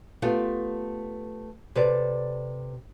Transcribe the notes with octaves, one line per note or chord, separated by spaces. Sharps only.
A3 B3 F4 G4 A4
C3 A4 B4 D5